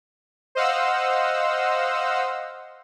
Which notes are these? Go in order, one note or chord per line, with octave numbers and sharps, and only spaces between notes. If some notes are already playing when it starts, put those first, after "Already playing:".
C5 D#5 F5 F#5 E6